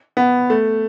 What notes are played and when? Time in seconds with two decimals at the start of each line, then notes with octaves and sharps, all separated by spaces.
0.17 B3
0.50 A3